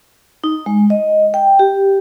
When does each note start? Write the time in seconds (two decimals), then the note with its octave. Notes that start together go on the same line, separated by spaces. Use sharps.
0.44 D#4
0.66 G#3
0.90 D#5
1.34 G5
1.59 G4